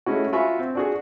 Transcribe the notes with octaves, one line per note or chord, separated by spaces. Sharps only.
G#3 A3 C#4 E4 F#4
F4 F#4 E5 G#5 B5 C#6
C4
D4 F#4 G#4